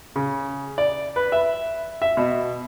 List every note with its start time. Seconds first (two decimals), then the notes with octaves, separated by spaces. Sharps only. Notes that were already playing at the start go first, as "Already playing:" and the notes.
0.16 C#3
0.78 D5
1.16 B4
1.32 E5
2.02 E5
2.17 B2